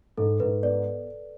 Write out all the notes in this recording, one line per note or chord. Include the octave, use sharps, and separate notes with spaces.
G#2 A4
G#2 B4
B3 D5